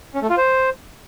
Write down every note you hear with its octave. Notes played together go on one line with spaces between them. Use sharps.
C#4
A3
F4
C5